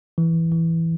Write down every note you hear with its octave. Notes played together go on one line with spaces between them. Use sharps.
E3
E3